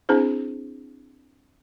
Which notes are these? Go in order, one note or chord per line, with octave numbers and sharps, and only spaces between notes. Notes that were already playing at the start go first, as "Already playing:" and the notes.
C4 D4 E4 G#4 C5